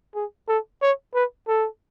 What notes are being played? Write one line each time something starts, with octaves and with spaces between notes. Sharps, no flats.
G#4
A4
C#5
B4
A4